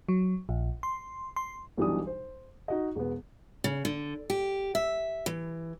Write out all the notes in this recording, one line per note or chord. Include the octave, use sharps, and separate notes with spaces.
F#3
A#1
C6
C6
B1 B2 E3 G3 D4 D#6
C5
D#4 F#4 D#5
E1 B3
C#3
D3
G4
E5
E3